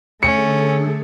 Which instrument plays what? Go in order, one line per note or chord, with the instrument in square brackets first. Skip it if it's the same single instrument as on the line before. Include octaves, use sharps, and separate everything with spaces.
[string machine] D3 G#4 A4 [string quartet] A3 [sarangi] C#4 [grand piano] C#7